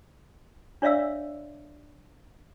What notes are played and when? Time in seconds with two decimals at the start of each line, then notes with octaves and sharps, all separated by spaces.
0.82 D4 C#5 D5 E5 F5 E6